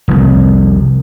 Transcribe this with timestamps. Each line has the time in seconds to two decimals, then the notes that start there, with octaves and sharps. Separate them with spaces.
0.08 F1 C2